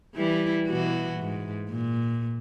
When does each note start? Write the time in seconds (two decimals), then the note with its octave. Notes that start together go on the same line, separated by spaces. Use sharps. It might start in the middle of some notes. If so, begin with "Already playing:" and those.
0.15 E3 G3 E4
0.68 B2 E3 F#4
1.21 G#2
1.70 A#2